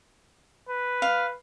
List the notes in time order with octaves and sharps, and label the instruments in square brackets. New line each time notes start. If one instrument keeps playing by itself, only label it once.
[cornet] B4
[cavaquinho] F5